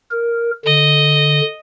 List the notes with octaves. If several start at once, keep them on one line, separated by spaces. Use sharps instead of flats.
A#4
D3 D#5